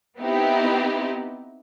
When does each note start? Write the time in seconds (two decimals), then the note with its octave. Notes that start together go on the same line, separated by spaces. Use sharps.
0.19 B3 C4 D#4 E4 G4